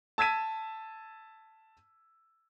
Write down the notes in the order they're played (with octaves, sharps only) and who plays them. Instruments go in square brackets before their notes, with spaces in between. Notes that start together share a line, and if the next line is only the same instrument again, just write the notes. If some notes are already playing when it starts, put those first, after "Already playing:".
[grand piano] A5 E6 G#6 B6 D#7